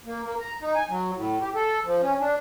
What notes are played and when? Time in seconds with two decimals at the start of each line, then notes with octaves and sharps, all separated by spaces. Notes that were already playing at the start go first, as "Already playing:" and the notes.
0.05 A#3
0.25 A#3
0.41 A#5
0.62 D#4
0.75 G#5
0.89 F#3
1.15 A2
1.41 G4
1.55 A4
1.86 F3
2.02 C#4
2.20 D4